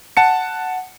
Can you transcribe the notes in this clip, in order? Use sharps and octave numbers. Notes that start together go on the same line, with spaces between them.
F#5 A5 C#7